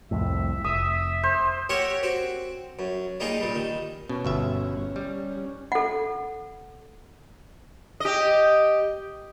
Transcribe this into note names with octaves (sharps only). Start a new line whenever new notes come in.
C2 F2 A2 E5
F1 E5 D#6
C5
G4 A#4 C#5 E5 F#5
C4 F#4
F#2
G3 A#3 D#4 F4 G#4
A#2 G3
D#3
B2 C#4
G1 B2 E5
G3
A4 F#5
G4 D#5